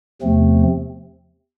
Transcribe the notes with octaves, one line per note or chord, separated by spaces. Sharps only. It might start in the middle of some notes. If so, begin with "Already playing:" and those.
E2 C3 F3 A3 C4